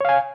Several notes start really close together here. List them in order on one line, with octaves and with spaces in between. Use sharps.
C#5 F5 G#5